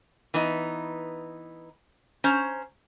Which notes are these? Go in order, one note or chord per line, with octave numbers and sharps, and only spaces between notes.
E3 B3 D#4
C#4 C5 A#5